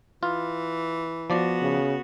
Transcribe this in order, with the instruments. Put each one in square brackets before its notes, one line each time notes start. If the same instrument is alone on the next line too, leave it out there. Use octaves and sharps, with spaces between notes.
[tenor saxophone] E3 [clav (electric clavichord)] F4
[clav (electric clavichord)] F3 D5 [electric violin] B3 F#4
[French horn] C#3